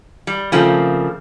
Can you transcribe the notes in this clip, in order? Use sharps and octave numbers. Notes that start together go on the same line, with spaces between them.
G3
C#3 F3 A3 A#3 C4